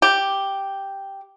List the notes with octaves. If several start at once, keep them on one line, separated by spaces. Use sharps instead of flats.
G4